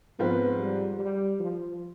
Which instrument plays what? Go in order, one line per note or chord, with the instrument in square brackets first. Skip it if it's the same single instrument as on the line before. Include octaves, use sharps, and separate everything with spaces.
[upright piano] G#2 F3 C4 F4 B4 [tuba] B3
[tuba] G3
G3
F3